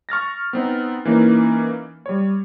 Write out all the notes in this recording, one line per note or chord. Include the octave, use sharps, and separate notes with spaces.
C#6 F6 A6 A#6
B3 C4 D#4
E3 A#3 C#4 D#4
G3 C#5